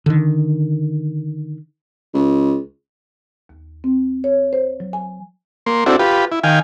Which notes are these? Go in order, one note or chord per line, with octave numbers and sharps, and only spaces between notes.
D3 D#3
C#2
D#2
C4
C#5
C5
F#3
G#5
A#3 C6
C4 D4 E4 F#4 A4
F4 G4 B4
E4
D#3 F5 G5 G#5